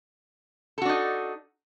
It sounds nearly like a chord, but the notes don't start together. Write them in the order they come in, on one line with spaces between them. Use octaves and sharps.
A4 F#4 D4 D#4